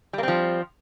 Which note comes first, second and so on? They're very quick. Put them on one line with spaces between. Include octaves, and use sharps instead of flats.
G3 A#3 C4 F3